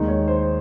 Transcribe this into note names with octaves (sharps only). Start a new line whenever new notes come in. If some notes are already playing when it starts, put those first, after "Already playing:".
Already playing: D#2 D#3 G#3 D#4
C#5
C5